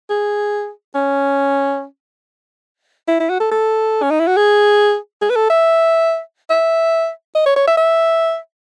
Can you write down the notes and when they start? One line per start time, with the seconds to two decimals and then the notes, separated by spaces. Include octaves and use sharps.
0.10 G#4
0.95 C#4
3.08 E4
3.20 E4
3.29 F#4
3.40 A4
3.51 A4
4.02 C#4
4.10 D#4
4.19 E4
4.27 F#4
4.37 G#4
5.22 G#4
5.30 B4
5.36 A4
5.50 E5
6.50 E5
7.35 D#5
7.46 C#5
7.56 C#5
7.67 E5
7.77 E5